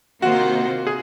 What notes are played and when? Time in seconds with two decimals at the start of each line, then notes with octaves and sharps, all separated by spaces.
0.22 C3 D#3 A#3 F4 F#4 C5
0.87 G#4